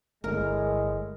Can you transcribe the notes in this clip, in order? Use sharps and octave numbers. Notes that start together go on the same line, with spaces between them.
G1 A2 G#3 A3 A#4